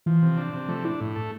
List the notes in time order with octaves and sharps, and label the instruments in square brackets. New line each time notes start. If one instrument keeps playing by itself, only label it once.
[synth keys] E3 [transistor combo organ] F3
[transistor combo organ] C3
D4
C3
[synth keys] F3 [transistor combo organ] A3
[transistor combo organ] D4 [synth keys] E4
[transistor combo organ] A2
A3